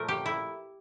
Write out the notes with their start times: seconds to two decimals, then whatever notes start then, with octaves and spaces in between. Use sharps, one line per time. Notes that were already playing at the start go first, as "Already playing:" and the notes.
Already playing: A#2 F3 A3 A#4
0.08 G4
0.26 E4